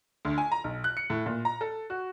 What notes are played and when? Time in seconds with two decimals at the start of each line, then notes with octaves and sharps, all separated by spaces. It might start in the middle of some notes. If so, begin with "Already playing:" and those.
0.25 D2
0.38 G#5
0.52 A#5
0.64 B1
0.84 F#6
0.97 C#7
1.10 A2
1.26 A#2
1.45 A#5
1.61 A4
1.90 F#4